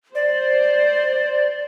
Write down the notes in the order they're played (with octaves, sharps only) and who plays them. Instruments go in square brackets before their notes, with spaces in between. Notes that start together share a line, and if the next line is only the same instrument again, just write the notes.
[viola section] C5 [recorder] D5